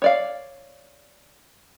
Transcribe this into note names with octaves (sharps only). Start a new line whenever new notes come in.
C#5 D5 F5